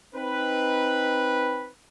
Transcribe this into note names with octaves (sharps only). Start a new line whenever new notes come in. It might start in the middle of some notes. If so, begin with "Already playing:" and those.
C4 D#4 B4